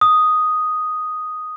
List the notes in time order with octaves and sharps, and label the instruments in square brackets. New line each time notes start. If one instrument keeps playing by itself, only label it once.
[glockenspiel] D#6